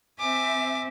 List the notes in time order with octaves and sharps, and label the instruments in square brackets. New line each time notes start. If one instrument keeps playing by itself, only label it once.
[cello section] C4 E5 [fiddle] G#5 D6